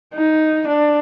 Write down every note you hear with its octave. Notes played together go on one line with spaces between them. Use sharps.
D#4
D4